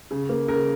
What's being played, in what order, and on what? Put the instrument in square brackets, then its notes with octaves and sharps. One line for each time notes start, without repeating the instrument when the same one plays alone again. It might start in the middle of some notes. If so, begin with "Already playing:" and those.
[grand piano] C#3
A#3
C#3 A#4